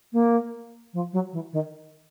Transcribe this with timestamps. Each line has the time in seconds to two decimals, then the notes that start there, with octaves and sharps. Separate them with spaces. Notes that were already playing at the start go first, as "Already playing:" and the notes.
0.13 A#3
0.93 F3
1.13 F#3
1.33 E3
1.53 D#3